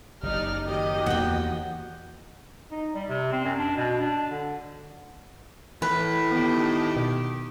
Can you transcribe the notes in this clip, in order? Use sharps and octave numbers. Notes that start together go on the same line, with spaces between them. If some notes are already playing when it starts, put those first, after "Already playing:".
F#1 D#4 G4 D5 F6
D#3 F#3 G4 D#5
E2 E3 A#3 F#5 G5
D#4
G3
C3
C4
F#2
D4
B2
D4
D3
A2 E3 B4
D#3 B3 D#4 G4
B2